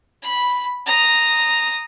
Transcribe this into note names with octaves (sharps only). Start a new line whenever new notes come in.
B5
A#5 D#6